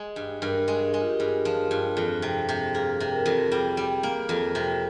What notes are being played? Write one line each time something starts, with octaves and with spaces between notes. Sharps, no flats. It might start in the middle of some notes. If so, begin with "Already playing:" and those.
Already playing: G#3
G2
G2 A#4
G#3
G#4
G#3
F4
G4
G2 G#4
F3
G2
F2
C3
C3
A#3 G#4
C3
A#4
F2
G3 G#4
G3
A#3
F2
C3